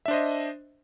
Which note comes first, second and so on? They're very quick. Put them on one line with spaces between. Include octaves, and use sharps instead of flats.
E5 D4 C5 D#5